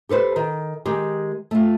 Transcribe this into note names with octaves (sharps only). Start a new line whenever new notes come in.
G4 A4 B4 C5
D#3
D#3 G#3 G4
A3 F4